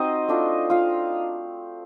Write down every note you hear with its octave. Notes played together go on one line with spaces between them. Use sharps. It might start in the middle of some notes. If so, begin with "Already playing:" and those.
Already playing: C4 D#4 F#4 C5 D#5
A3 D4 F4
F4 F5